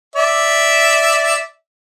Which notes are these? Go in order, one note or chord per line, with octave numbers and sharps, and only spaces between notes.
D5 E5